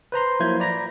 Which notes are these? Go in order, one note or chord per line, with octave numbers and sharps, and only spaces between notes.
B4 C5 A#5 C6
F3 F#3 A#3 E4 G6 G#6
D5 A#5 B5 A#6